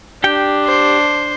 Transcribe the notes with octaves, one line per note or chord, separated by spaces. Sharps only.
D4 G4 G5
C5